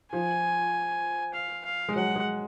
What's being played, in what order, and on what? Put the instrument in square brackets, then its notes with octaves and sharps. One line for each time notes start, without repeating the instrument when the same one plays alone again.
[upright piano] F3 [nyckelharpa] G#5
[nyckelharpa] F5
F5
[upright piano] G#3
[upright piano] F#3 [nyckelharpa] F#5
[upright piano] G#3